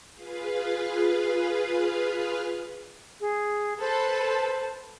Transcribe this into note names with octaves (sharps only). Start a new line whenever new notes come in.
F4 G#4 B4 F5
G#4
A4 B4 C5 A5